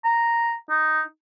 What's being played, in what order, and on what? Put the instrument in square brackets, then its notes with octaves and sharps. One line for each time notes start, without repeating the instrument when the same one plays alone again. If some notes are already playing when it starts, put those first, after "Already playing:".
[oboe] A#5
D#4